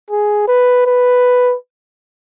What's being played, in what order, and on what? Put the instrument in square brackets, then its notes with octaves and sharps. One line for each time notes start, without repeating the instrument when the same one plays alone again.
[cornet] G#4
B4
B4